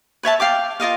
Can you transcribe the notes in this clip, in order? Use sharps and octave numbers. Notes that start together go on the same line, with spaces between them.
B4 C#5 E5 A5
F5 G5 D6
F4 A#4 D#5 F5